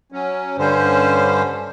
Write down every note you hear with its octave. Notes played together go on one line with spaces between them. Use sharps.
F#3 C#4
G2 D3 G3 C#4 C5